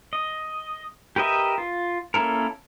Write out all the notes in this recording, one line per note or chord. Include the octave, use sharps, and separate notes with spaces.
D#5
G4 A#4 B4 D#5 E5
F4
A#3 C#4 E4 A4 A#4